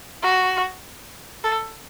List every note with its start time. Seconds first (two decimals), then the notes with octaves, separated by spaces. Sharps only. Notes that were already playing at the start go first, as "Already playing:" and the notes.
0.23 F#4
1.44 A4